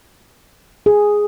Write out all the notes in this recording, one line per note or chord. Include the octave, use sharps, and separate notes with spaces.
G#4